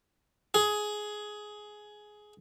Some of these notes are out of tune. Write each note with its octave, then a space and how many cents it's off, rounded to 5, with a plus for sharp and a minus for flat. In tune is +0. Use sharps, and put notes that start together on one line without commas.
G#4 +15